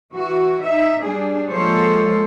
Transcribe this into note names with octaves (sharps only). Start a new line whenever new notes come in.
E3 F#4
D#4 E5
G3 D4 G#4
F3 G#3 A#3 A4 C5 C#5